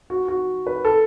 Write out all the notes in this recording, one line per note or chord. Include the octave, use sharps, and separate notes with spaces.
F#4
F#4
B4
A4